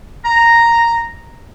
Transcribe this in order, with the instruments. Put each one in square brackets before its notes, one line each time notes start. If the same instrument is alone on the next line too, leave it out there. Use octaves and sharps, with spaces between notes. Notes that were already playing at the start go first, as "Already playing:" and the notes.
[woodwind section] A#5